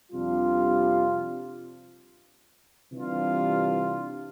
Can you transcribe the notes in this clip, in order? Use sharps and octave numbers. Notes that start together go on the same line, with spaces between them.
F2 C3 G3 D4 F4
C3 E3 G3 D4 F4